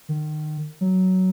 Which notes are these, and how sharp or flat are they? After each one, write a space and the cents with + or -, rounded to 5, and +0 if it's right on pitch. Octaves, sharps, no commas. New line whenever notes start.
D#3 -30
F#3 +10